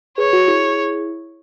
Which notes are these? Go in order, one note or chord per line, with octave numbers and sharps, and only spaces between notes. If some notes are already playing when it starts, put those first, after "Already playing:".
G#4 B4 C#5
F#4
E4 G#4